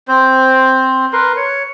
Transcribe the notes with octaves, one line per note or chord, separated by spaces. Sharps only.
C4 C5
A#4 B4 C6
C#5